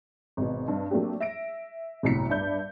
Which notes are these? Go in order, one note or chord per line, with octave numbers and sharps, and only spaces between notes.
G#1 B2
G2
F#3 A3 A#3 C4 D4 G4
E5 A#6 D7
G1 C2 A2 F#3 B6 C#7
G2 D5 E5 B5 G6